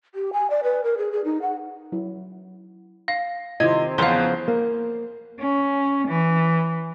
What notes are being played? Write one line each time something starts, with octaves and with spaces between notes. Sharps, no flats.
G4
G#5
D5
B4
A#4
G#4
G#4
D#4
F#5
F#3 E4
F5 A#6
C3 D#3 E4 F4 D#5 G#6
E2 C#3 F3 B3 F5 C6
A#3
C#4
E3